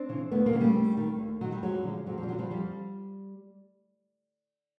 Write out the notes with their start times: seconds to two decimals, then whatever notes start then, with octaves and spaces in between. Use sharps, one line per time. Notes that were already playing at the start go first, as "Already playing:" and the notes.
Already playing: C4 D4
0.09 C#3 E3
0.31 D#2 A3 B3
0.46 G#3 A#3
0.53 C#3 E3
0.60 G3 A3
0.75 D#2
0.97 D#3
1.19 D#2
1.41 D#3 F#3
1.52 G3
1.63 F2 F#3 G#3
1.84 D3 F3
2.06 F2 F#3
2.18 F3
2.23 G3
2.28 D3 F3 F#3
2.38 F3 G3
2.50 F2 F3 G3